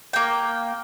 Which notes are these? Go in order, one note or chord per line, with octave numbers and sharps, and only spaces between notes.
A#3 G5